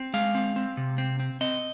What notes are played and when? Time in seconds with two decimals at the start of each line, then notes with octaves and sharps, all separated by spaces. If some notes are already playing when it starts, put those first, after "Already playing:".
Already playing: C4
0.14 G#3 F5
0.35 C4
0.56 C4
0.77 C3
0.98 C4
1.20 C4
1.41 C4 D#5